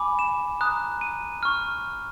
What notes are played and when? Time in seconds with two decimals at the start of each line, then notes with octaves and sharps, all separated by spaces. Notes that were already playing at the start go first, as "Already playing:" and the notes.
Already playing: G#5 B5 D6
0.19 E7
0.61 A#5 D#6 F#6
1.01 D#7
1.43 C#6 F6